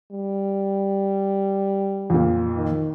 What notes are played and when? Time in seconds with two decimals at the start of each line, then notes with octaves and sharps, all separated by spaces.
0.12 G3
2.10 F2 A#2
2.56 D#3